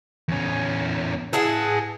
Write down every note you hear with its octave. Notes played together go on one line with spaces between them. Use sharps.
E2 C#4
E4 G#4 B4 F#5 A5